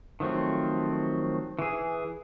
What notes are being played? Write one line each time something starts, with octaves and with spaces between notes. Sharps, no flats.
D#3 F3 F#3 A3 C4
E3 G#4